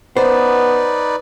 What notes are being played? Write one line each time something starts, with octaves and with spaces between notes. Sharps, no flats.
B3 D#4 B4 C5 D5